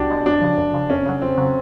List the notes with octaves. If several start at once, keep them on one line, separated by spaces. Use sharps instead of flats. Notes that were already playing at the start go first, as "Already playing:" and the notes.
Already playing: C2 B2 D4 F#4 G4
B2 G#3
F#2 D4
C#3 F3
F#2
C#3 F3
F2 C#4
C#3 F#3
F2 C4
C#3 F#3